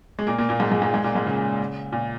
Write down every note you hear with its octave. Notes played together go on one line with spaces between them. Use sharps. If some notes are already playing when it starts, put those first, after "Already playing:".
G#3
A#2 A#3
A#2 A#3
A#2 A#3
G#2 G#3
G#2 G#3
G#2 G#3
G#2 G#3
A#2 A#3
G#2 G#3
C#3
A#2